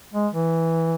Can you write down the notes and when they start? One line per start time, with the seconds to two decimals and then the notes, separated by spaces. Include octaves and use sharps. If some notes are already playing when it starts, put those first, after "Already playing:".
0.14 G#3
0.34 E3